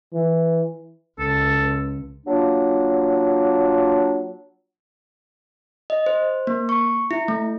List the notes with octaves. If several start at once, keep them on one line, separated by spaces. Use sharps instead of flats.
E3
C#2 A4
F#3 A#3 D4 F4
D#5
C5
A#3
C#6
E4
A3